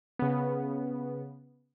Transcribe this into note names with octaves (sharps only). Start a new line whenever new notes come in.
C#3 B3